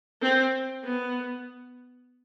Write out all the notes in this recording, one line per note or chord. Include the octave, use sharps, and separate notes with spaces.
C4
B3